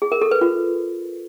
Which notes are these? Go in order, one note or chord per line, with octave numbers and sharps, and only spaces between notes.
G#4
A#4
A4
B4
F4